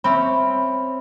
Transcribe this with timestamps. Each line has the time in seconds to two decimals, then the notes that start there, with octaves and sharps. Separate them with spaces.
0.04 C4 C#4 E5 B5